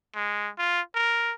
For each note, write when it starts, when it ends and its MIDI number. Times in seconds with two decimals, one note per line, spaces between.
0.15 0.50 56
0.58 0.81 65
0.95 1.34 70